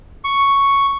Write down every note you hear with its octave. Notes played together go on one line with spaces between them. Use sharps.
C#6